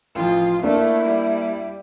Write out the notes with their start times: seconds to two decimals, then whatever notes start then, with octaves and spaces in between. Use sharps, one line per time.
0.15 A1 F3 F4
0.63 A3 A#3 D4 E4
1.06 G3